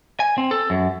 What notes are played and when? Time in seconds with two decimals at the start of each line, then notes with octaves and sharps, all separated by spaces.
0.20 G#5
0.38 C4
0.51 A4
0.70 F#2